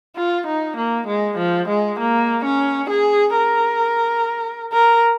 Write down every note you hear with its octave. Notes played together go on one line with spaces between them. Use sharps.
F4
D#4
A#3
G#3
F3
G#3
A#3
C#4
G#4
A#4
A#4